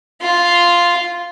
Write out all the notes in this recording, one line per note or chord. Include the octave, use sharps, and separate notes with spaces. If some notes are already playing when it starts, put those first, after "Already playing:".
F4